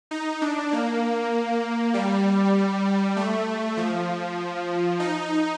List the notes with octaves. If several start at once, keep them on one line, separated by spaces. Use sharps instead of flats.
D#4
D4
A#3
G3
A3
F3
D#4